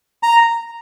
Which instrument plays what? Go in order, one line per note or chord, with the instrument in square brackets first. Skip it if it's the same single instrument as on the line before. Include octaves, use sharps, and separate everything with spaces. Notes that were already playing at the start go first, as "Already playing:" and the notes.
[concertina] A#5